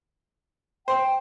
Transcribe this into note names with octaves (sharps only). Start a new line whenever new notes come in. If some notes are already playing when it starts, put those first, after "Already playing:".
C5 G5